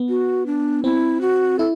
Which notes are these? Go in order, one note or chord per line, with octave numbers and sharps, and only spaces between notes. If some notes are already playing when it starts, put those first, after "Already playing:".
Already playing: B3
F#4
D4
C4 E4
F#4
E4 A4